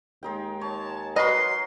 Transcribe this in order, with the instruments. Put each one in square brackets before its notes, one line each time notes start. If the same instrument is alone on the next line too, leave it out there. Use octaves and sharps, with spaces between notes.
[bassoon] D#2 [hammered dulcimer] G#3 D#4 G5
[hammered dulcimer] C#5 [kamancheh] A5
[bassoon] F#3 [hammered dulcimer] F#4 A#4 [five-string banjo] B4 D#5 [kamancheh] C6